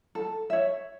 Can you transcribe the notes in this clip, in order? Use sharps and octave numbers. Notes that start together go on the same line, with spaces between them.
A4
C#5 E5